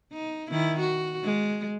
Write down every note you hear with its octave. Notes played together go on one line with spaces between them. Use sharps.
D#4
D#3 E4
F#4
G#3